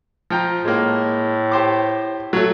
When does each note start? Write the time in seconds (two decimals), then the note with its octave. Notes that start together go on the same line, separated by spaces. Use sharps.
0.30 F3 G5 A#5
0.65 A2 G#3 A#3
1.52 G4 C5 D6
2.33 F#3 A3